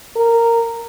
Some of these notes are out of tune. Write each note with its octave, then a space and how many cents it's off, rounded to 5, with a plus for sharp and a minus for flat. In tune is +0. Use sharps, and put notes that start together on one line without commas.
A#4 -10